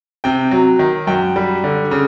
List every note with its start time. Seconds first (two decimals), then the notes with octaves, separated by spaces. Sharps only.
0.24 C3 G5
0.51 F#3
0.79 D#3
1.07 F#2 G5
1.36 G3
1.64 D3
1.91 C#3